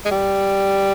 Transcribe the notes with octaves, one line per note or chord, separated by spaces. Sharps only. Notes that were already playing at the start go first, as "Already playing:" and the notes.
G#3
G3